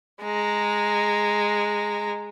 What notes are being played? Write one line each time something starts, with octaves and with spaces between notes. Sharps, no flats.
G#3 A#5